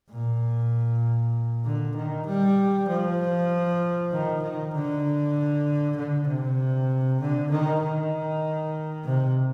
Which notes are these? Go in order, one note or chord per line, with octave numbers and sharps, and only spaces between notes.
A#2
D3
D#3
G3
F3
D#3
D#3
D3
D3
C3
D3
D#3
D#3
C3